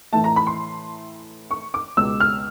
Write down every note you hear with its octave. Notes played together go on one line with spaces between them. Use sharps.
A2 E3 A3 A5
A#5
B5
C6
C#6
D6
C#2 B2 G#3 E6
F6